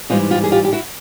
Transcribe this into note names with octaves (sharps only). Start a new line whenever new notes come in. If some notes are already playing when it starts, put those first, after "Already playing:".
G#2 E3 G3 D#4 F4
F4 G4
G#4
F4 G4
G4
E4 F#4